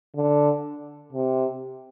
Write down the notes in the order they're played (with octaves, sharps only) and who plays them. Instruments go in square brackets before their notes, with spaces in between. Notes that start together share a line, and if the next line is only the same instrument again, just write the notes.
[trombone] D3
C3